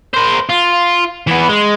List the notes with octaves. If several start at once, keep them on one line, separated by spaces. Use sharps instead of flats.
A#4 C5
F4
E3 B3
G#3